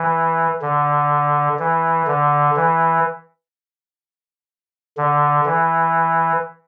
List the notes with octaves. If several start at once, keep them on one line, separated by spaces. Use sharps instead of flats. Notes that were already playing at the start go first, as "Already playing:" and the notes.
Already playing: E3
D3
E3
D3
E3
D3
E3